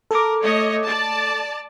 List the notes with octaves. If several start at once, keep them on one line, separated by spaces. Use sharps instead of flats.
A4 A#4 D6
A3 C#5 D#5
D5 A5